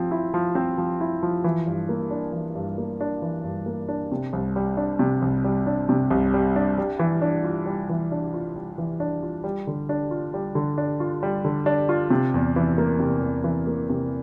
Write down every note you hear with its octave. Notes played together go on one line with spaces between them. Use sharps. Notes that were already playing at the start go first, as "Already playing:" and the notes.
Already playing: F3 C4
E4
F3
C4
F3
E4
F3
E3
G2
A#3
D4
E3
G2
A#3
D4
E3
G2
A#3
D4
C3
C2
G3
D4
C3
C2
G3
D4
C3
C2
G3
D4
G3
E3
D4
F4
G3
E3
D4
F4
G3
E3
D4
F4
G3
D3
D4
F4
G3
D3
D4
F4
G3
D3
D4
F4
C3
E2
E3
A#3
C3
E2
E3
A#3
C3